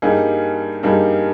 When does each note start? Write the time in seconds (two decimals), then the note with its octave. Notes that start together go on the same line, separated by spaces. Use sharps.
0.02 G2 G3 A#3 D#4 G#4
0.83 G2 G3 A#3 D#4 G#4